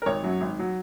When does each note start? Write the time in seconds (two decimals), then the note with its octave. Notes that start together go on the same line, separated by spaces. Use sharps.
0.02 A#4
0.06 G#1 C#5
0.23 F#2 F#3
0.41 G#1
0.59 F#3